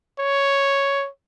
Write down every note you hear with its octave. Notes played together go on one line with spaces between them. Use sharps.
C#5